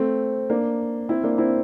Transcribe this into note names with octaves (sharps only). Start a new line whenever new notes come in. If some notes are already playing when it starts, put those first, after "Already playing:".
Already playing: A3 C4
A#3 D4
C4 E4
A#3 D4
C4 E4